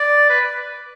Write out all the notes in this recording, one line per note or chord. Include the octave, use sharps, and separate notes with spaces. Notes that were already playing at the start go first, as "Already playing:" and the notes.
Already playing: D5
B4